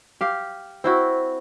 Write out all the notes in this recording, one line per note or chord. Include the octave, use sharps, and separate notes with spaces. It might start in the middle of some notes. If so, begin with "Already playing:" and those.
G4 F5
C4 E4 F#4